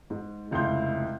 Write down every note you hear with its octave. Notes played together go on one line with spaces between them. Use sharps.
G#2
F1 C#2 E4 C6 G6